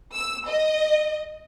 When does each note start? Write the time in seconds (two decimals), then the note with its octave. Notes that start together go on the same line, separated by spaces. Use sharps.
0.13 E6
0.47 D#5